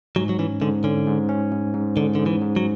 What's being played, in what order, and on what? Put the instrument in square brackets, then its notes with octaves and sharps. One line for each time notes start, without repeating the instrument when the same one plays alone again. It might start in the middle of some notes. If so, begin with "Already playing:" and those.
[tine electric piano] G#2 [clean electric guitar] F#3
[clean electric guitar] F#3
[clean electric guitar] E3 [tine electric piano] C#4
[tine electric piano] G#2 [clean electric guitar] D3
[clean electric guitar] D3 [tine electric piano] C#4
[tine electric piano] G#2
C#4
G#2
G#2
[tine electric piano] G#2 [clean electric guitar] D3
[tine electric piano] G#2 [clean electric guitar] D3
[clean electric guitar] E3
[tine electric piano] G#2
[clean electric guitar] F#3